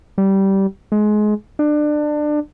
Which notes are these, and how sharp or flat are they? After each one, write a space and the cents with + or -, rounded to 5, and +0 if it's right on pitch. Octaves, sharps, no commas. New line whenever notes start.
G3 -15
G#3 +25
D4 +25